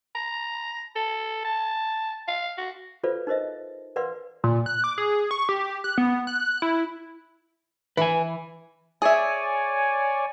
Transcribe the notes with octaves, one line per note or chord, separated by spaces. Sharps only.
A#5
A4
A5
F5
F#4
F4 A4 B4 C5 D5 F5
D#4 A#4 C5 D#5 E5
A#4 B4 D5 F5 F#5 C6
A#2
F#6
D6
G#4
C#6
G4
F#6
B3
F#6
E4
E3 B4 G#5
G#4 C#5 D5 E5 G#5